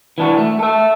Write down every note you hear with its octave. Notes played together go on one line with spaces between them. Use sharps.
E3 D4 F#4
A3
A4 E5